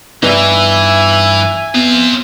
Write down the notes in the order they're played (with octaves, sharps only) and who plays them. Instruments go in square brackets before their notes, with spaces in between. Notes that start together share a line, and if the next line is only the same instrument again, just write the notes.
[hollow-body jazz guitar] G2 B3 D#4 [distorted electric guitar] E3 [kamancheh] E5 G#5
[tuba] B3 [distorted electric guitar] C4 F4